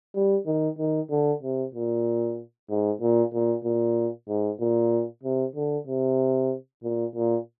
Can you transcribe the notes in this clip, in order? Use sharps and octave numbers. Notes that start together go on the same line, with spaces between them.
G3
D#3
D#3
D3
C3
A#2
G#2
A#2
A#2
A#2
G#2
A#2
C3
D3
C3
A#2
A#2